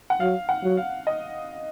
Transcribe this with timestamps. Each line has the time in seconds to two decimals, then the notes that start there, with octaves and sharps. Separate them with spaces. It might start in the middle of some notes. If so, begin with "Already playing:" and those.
0.10 F#5
0.20 F#3 F5
0.49 F#5
0.63 F#3
0.77 F5
1.07 D#5